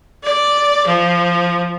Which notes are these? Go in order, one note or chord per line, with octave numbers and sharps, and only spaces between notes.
D5
F3